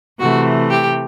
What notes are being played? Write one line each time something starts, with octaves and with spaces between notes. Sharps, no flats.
C3 E3 A3 F#4
G4